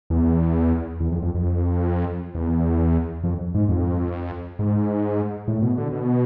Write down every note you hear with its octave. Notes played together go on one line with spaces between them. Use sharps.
E2
E2
F2
F2
F2
E2
F2
G#2
F2
G#2
A2
B2
D3
B2